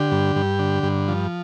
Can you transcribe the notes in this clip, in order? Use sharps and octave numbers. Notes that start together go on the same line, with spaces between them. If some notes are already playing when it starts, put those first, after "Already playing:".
Already playing: D3 G4
G2
G2
D3
G2
F3